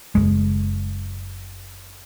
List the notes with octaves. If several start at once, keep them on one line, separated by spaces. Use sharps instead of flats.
F#1 E2 G#3